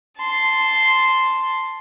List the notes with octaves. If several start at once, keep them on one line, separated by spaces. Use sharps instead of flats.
A5 C6